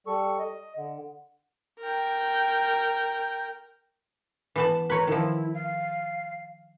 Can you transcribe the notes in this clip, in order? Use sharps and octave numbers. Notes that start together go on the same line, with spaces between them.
G3 A4 C#6
D#5
D3
A#4 G5
E3 B3 A5
B4 C#5 A#5
D#3 F3 E4
F5